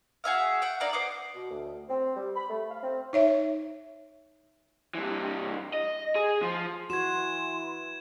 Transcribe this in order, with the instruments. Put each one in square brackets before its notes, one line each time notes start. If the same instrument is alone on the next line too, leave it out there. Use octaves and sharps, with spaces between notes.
[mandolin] F#4 G#4 E5 F5
F#5 G5
A#3 D#4 D5 E5
B3 C5 D6
[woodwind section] B2
D2
C4
G3
B5
A3
F5
C4
[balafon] D#4 C#5 E5
[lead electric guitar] G2 E3
D#5
G#4
F3
[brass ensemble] E3 [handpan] F#4 [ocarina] C6 [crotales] G#6 E7